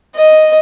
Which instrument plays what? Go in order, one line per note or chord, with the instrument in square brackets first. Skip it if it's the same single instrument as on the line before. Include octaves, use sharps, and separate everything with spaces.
[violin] D#5